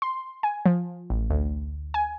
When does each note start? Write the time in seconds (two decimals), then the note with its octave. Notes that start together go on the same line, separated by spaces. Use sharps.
0.02 C6
0.43 G#5
0.66 F3
1.10 A1
1.30 D2
1.94 G#5